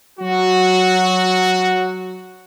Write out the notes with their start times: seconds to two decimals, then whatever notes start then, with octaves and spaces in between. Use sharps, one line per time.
0.19 F#3 F#4